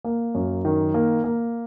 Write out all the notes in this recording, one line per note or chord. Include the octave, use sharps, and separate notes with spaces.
A#3
F#2
D#3
A#3
A#3